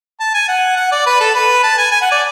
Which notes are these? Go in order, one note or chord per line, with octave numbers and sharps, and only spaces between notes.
A5
G#5
F#5
F#5
D5
B4
A4
B4
A5
G#5
G#5
F#5
D5